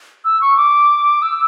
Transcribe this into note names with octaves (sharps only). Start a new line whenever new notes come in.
E6
C#6
D6
E6